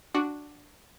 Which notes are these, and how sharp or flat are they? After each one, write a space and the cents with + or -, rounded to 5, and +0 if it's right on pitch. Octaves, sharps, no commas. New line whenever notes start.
D4 +0 F#4 +0